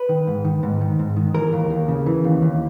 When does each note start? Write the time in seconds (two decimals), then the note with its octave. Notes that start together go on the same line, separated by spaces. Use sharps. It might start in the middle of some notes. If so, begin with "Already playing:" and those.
Already playing: B4
0.09 D#3
0.27 G#2
0.45 D#3
0.63 G#2
0.81 D#3
0.99 G#2
1.16 D#3
1.34 E3 A#4
1.53 D#2
1.70 D#2
1.88 C#3
2.06 E3
2.24 D#2
2.42 D#2